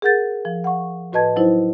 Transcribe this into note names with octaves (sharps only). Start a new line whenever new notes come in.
G#4 A#4 F#5 G6 A6
F3
F#5 C#6
A2 F#4 B4 D#5 A5 G#6
F#3 D#4 E4 C5